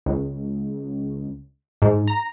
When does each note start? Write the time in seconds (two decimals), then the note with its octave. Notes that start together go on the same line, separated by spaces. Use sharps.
0.06 C#2
1.82 G#2
2.07 A#5